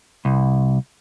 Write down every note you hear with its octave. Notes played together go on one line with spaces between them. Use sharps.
C2